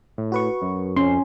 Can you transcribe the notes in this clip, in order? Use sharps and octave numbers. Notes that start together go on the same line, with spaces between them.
A2
F#4 B4 C#6
F#2
F2 C#4 C6